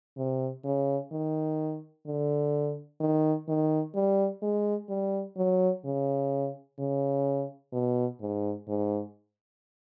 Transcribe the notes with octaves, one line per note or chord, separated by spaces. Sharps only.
C3
C#3
D#3
D3
D#3
D#3
G3
G#3
G3
F#3
C#3
C#3
B2
G#2
G#2